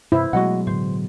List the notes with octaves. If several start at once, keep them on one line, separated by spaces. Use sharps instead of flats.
G2 C3 A3 E4 C5
B2 F#3 G#3 A3 F#4 D#5 F#5
A2 D3 C5